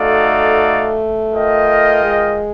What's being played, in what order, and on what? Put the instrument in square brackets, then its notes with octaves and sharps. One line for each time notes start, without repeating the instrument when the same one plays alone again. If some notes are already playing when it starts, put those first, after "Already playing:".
Already playing: [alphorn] A3 [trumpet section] D#4 F#4 A4 D5 F5
[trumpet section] F4 A#4 D#5 G5
[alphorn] G#3